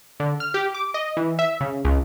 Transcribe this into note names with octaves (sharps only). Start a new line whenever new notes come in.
D3
F6
G4
D6
D#5
E3
E5
C#3
C#2